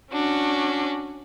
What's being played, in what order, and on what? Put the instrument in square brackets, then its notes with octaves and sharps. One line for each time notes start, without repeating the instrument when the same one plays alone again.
[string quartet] C#4 D4 F#4